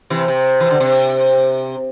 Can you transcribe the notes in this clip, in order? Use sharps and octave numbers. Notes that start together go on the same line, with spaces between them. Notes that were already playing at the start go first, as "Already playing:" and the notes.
C3 E3
C3
E3
D3
C3